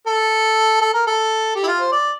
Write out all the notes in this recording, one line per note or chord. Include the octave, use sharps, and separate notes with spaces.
A4
A4
A#4
A4
G4
E4
F4
C5
D5